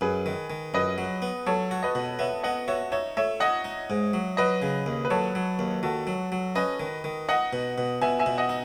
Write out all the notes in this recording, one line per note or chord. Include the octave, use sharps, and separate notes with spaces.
F#2 G#4 B4
D#3
D#3
F#2 B4 D#5
F#3
B3
F#3 A4 C#5
F#4
B4 D#5
B2
B3 C#5 E5
B3 D#5 F#5
F#4 C#5 E5
D#4 C#5 E5
A3 C#5 E5
D#4 D#5 F#5
D#4
G#2
F#3
F#3 B4 D#5
C#3
D#2
B4
F#3 A4 C#5
F#3
D#2
D#3 F#4 A4
F#3
F#3
C#4 B4 D#5
D#3
D#3
D#4 D#5 F#5
B2
B2
B2 E5 G#5
E5 G#5
B2
D#5 F#5
D#4